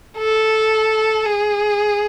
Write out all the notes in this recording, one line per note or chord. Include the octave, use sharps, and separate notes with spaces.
A4
G#4